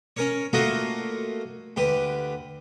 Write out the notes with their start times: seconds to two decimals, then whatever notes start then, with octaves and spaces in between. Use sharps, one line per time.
0.17 C#4 A#4 C#5
0.53 A3 A#3 F4 F#4 C#5 D#5
1.77 D2 G4 B4